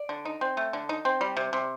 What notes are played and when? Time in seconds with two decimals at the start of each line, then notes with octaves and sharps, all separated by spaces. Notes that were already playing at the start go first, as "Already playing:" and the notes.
Already playing: D5
0.09 D3
0.25 D#4
0.41 C4
0.57 A3
0.73 D3
0.89 D#4
1.05 C4
1.21 G3
1.37 C3
1.53 C3